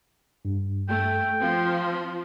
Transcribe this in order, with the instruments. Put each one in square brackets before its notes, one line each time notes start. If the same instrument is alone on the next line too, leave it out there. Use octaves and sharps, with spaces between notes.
[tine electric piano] G2
[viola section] A3 [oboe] G5
[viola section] F3 [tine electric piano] C4